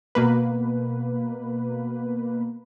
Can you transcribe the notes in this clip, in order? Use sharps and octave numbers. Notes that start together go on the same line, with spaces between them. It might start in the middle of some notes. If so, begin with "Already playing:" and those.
B2 A#3 B4